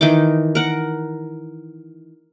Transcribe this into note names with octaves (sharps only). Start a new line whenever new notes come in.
D#3 E3 D#4 D6
A#4 F#5